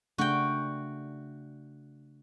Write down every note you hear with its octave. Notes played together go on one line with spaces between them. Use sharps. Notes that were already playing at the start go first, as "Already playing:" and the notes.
C#3 A3 D4 F#4 G5